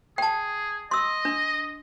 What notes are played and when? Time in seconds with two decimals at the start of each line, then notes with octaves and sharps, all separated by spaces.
0.18 G#4 G5 A5
0.91 D#5 C6 E6
1.25 D4